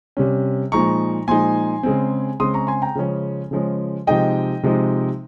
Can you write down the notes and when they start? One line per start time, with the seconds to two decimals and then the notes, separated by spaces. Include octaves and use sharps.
0.17 C3 G3 C#4
0.72 A#2 F3 G#3 D#4 A#5 C#6
1.28 A#2 F3 G#3 D#4 G#5 C6
1.83 C#3 G#3 C4
2.40 C#3 G#3 C4 C6 D#6
2.54 A#5 C#6
2.67 G#5 C6
2.82 G5 A#5
2.95 C#3 F3 G#3 C#4
3.51 C#3 F3 G#3 C#4
4.07 C3 F3 G#3 D#4 D#5 G5
4.63 C3 F3 G#3 D#4